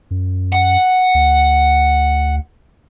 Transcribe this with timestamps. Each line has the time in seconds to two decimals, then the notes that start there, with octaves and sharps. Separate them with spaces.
0.11 F#2
0.52 F#5
1.15 D2